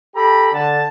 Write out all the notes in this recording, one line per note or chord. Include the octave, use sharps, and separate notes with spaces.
G4 A4 A#5 B5
D3 A5